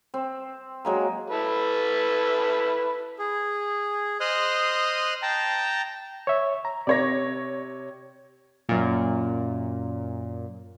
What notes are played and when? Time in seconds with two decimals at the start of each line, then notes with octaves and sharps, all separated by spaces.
0.14 C4
0.85 F#3 G#3 A#3
1.30 E4 A4 B4
3.19 G#4
4.20 C5 D#5 C6 D#6 F6 F#6
5.22 G5 A5 A#5
6.27 C#5 E5
6.65 A#5
6.87 C3 C#5 D5 A#6
8.69 F#2 A#2